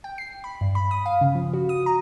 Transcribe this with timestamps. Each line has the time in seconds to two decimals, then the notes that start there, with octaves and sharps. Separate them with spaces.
0.04 G5
0.18 C7
0.44 B5
0.61 G2
0.75 B5
0.91 D#6
1.06 F5
1.21 C#3
1.35 F3
1.53 F#4
1.69 D#6
1.86 A#5